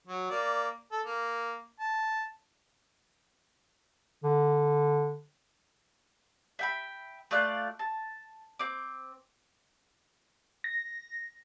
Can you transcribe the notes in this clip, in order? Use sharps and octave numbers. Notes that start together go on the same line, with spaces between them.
F#3
A#3 D5
A4
A#3
A5
D3
E5 G5 B5
A3 F4 D5 F#6
A5
C4 D6
A#6